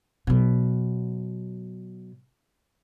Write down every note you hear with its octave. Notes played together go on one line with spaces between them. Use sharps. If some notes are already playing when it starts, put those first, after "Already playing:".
B2 F#3